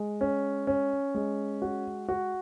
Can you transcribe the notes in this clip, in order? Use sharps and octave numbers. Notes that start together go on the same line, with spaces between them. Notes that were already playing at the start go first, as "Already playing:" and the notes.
Already playing: G#3
C#4
C#4
G#3
F#4
F#4